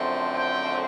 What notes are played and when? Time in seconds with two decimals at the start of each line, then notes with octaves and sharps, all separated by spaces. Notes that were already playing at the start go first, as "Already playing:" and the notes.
Already playing: F#2 D3 F3 A3 C4
0.34 G5